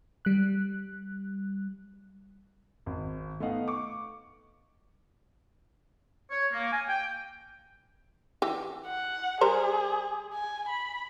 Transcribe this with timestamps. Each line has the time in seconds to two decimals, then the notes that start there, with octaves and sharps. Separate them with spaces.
0.25 G3 F#6
2.86 G#1
3.40 A3 B3 D#4 D#5 F5 F#5
3.68 C#6 D6
6.31 C#5
6.53 A#3
6.73 G#5
6.89 G5
8.42 E3 G4
8.86 F#5
9.41 G3 G#4 A#4 C5
10.33 G#5
10.69 B5